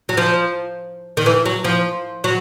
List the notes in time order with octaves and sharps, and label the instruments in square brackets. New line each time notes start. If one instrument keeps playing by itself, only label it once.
[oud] F#3
F3
D#3
E3
F#3
F3
F#3